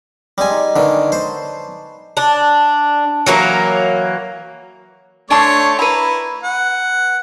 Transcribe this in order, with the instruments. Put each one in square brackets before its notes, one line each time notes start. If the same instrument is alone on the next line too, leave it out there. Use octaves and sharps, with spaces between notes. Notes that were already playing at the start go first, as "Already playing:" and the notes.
[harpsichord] G3 G#5 [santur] G#4 C5 D#5
[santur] D#4
[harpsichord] D3 D#3 [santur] B4 C#5
[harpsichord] C5 [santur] A5 D6
[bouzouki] D4
E3 F#3 A#3
[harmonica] A3 C#5 [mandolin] D4 A5 C6
[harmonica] E4 [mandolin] B4 A#5
[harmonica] F#5